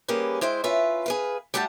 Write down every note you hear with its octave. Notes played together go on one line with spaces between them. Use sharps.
G3 A#3 C#4 G4 G#4 B4
G#3 E4 C5 G5
C#4 F4 B4 E5
G#4 B4 F5
G3 A3 G4 F#5 A5